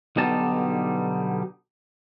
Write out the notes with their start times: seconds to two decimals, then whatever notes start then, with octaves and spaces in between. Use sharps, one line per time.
0.17 B1 B2 D3 G3 D#4 A5